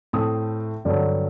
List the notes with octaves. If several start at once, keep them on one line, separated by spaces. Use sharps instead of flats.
A2 A3 C4 D#6
G2 D3 F#3 C4